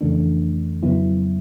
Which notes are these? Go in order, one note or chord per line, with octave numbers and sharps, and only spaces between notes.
F2 C#3 E3 A3 D4
F2 C#3 F#3 B3 E4